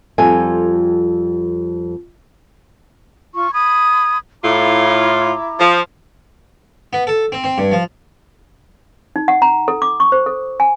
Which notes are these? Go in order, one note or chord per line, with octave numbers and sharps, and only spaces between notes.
F2 G3 F4 A4 G#5
F4 C#6
B5 D#6 G#6
A2 E4 F4 A#5 D6
F3
B3
A4
C4
C4
G2
F3
D#4
F#5
A#5
A4
D6
C#6
C5
A4
G#5